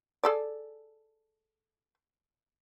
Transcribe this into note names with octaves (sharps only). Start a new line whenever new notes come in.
G#4 A4 D5